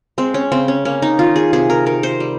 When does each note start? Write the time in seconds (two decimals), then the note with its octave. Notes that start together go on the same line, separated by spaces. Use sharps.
0.18 G#3 C4
0.34 C#4
0.52 C#3 C4
0.68 C#4
0.85 A#3 C#4
1.02 D#4
1.19 D#3 F4
1.36 G#4
1.53 C3 G#4
1.70 A#4
1.86 D#3 A#4
2.03 C5
2.20 G3